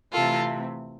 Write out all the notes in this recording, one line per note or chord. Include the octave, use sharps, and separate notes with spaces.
C3 E3 A3 C4 F4 A4